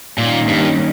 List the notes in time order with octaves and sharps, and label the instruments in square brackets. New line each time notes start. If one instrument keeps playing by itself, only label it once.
[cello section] D#2 D#3 G3 C#4 [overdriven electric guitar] A#2
[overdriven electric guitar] G2